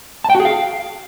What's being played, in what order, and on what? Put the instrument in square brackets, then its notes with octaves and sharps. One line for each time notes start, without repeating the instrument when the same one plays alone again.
[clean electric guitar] A5
G5
F#4
G#4
F5